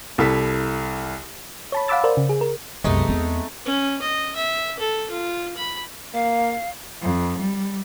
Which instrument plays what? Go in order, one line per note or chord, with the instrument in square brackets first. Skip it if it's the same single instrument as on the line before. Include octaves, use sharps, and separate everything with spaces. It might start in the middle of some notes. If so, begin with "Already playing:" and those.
[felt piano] C2 E4 A4 B6
[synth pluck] C#5 A5 B5
F5 F#5 B5 D6 E6 A6
A#4 C5 D5
C#3
G#4
A#4
[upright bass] C2 F#2 [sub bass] C3 [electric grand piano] G#3 B3 [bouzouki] A3 D#4
[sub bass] E2 [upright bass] C4
[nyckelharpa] C#4
D#5
E5
A4
F4
B5
[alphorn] A#3 [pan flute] F5
[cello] F2
G3